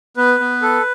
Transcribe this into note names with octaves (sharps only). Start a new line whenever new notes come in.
B3 B4
B3
A4